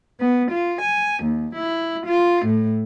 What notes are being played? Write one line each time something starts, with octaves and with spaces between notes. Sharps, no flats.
B3
F4
G#5
D#2
E4
F4
A2